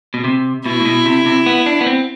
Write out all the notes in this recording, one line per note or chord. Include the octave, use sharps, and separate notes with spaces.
B2
C3
B2 E4
A2
B2
C3
C3
B3
D4
B3
C4